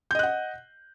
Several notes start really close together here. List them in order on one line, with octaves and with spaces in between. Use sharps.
G6 D#5 F#6 F#5